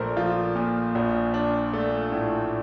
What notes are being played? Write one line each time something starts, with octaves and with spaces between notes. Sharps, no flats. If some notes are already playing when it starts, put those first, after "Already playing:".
Already playing: A#1 A3 A#4 C5 D5
F3 F4
A#2
A#1
D4
A3
A2